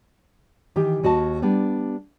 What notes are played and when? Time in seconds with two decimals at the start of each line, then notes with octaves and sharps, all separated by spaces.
0.76 D#3 E3 G4
1.03 D#2 F#4 D#5 A5
1.42 G3 B3 D4